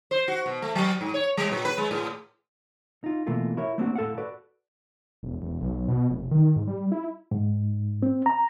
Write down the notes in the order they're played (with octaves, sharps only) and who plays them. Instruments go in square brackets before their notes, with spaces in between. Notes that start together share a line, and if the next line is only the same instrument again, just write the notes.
[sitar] C5
F#4
B2
A3
F#3
G#2
C#5
G3
A#2
B4
G#3
A2
[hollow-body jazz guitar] D#4 F4
B2 E3 A3 A#3 F4
E4 F#4 A#4 C#5 E5
A3 A#3 C4 D4 D#4 F#4
A2 A4 F5 F#5
F#4 A4 B4 D5
[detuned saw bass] E1
E1
B1
B2
F1
D#3
G#2
G3
E4
[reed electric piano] G#2
C4
A#5